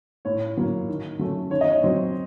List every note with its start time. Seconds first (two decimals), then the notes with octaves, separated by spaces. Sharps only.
0.25 A2 C#5
0.57 F#3 A#3
0.88 D#3
1.19 F#3 A3 C#4
1.51 D#3 C#5
1.61 D#5
1.70 C#5
1.82 F#3 C4 C5